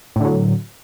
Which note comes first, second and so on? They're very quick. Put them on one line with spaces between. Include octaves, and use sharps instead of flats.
A2 D3 F#3